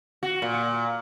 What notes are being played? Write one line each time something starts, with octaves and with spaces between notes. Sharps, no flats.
F#4
A#2